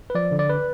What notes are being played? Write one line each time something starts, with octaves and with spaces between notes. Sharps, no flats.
B4
F3 D5
D3
D5
B4